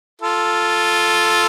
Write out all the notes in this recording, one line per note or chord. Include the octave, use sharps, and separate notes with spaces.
F4 A4